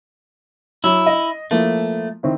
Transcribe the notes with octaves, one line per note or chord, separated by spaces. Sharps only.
F#3 E4
D#5
F3 A3 A#3 E4
D#3 C4 E4